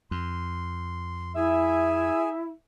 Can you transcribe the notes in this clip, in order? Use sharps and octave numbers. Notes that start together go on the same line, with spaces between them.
F2 C6
E4 G#4 E5 G#5